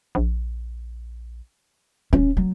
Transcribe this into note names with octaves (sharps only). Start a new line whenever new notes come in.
A#1
D#1 C#4
F#3